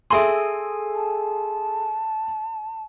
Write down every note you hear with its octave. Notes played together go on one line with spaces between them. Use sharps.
G#4 A4 E5 G#5 C6
A5